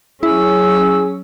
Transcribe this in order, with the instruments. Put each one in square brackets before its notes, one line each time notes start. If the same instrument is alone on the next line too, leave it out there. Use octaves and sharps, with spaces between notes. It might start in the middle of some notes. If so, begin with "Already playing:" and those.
[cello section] F#3 C#4 [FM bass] E4 [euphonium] G#4 [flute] E6